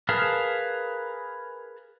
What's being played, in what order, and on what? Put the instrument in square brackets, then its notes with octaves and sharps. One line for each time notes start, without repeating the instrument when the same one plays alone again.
[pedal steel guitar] G#4 A#4 B4 F5 A5